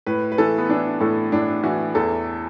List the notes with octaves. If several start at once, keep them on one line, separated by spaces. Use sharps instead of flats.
A2 B4
B4
E3 A4
B3
E3 D4
A2 A4
A2 D4
E3 F#4
E2 A4